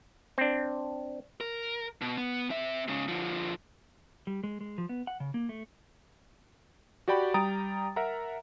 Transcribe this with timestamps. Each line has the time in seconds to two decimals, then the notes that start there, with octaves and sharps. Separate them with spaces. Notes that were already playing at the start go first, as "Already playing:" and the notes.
0.38 C4 D4
1.41 A#4
2.01 B2
2.18 B3
2.50 C4 E5
2.88 G#2 C#3
3.08 D3 F3
4.27 G3
4.43 G#3
4.61 G#3
4.78 F3
4.89 B3
5.07 F#5
5.20 C#3
5.34 A#3
5.49 A3
7.08 F#4 G4 D5 G5 B5
7.34 G3 G5 A#5 D#6 A6 D7
7.96 A#4 E5 F#5 A#5